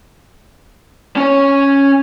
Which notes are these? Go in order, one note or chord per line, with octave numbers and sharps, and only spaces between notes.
C#4 C#5